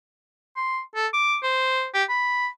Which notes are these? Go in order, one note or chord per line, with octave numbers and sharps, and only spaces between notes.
C6
A4
D6
C5
G4
B5